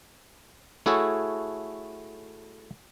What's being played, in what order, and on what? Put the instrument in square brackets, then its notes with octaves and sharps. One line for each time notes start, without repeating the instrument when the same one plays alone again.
[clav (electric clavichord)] A3 E4 F#4 G#4 A4 C#5